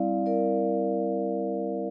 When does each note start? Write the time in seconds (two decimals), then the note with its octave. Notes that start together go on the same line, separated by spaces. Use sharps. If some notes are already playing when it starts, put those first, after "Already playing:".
Already playing: G3 C4 E4 D5 F5
0.26 A#4 D5